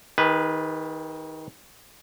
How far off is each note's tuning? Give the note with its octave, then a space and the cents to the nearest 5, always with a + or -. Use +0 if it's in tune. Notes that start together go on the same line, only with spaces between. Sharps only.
D#3 +20 G#4 -40 B4 +0